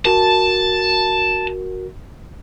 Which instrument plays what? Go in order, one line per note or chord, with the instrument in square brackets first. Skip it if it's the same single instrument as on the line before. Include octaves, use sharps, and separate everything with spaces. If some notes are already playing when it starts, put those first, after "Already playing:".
[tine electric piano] F#4 A#4 [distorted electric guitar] A5